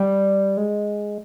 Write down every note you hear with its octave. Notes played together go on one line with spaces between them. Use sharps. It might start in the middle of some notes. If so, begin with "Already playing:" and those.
Already playing: G3
G#3